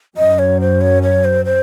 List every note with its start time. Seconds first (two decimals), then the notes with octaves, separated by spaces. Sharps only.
0.17 F#2 D#5
0.39 C#5
0.61 C5
0.81 C#5
1.03 C#5
1.25 C5
1.45 C5